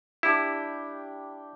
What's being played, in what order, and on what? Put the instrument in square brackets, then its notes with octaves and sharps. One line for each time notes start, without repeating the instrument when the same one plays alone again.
[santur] D4 G4 B5 [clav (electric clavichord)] E4